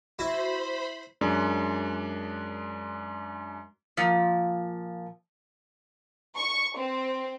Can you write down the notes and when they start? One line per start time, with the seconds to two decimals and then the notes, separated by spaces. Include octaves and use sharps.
0.19 E4 F#4 C5 B5
1.21 F#2 G#3 D4
3.97 A#2 F3
6.36 C#6
6.78 C4